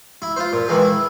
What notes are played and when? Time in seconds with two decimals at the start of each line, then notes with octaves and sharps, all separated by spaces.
0.22 E4
0.36 F4 C5
0.53 A#2
0.69 D#3 E3 G#3
0.82 E4